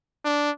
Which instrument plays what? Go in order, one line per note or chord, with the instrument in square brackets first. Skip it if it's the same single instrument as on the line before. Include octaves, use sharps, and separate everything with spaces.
[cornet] D4